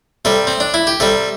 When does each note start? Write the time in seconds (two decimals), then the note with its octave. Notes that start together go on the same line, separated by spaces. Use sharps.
0.25 C3 G3 A4
0.47 C4
0.60 D4
0.74 E4
0.87 G4
1.00 C3 G3 A4